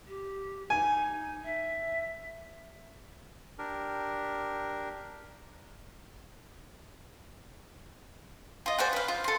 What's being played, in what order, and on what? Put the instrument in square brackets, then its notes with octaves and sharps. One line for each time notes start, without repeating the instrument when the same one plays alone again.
[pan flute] G4
[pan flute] D#4 [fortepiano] G#5
[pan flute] E5
[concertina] D4 G4 A#4
[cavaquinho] F4 D#5
G#4 C5 D5 F#5
B4 F5
F4
A4 C6